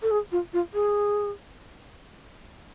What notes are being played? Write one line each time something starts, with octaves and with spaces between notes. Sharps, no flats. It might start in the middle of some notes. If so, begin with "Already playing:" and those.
A4
G#4
F4
F4
G#4